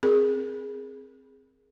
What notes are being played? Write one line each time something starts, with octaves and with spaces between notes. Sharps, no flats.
C4 G#4 A#4